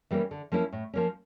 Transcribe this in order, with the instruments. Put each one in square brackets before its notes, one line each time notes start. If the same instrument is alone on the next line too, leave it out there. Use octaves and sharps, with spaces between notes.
[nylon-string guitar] E3 G3 A#3 C#4
D3
F3 A#3 C#4 E4
A2
F3 A#3 C#4